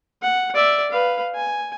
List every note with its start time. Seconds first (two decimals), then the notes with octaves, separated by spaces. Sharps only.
0.22 F#5
0.55 D5 E5
0.91 B4 F5
1.35 G#5